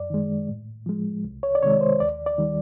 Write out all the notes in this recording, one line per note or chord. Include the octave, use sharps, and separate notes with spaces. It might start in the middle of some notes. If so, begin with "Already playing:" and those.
Already playing: F#2 D5
D#3 G#3
A2
F3 G#3
C2
C#5
D5
C3 D#3 G#3 C#5
C5
D#2 D5
D5
D#3 G3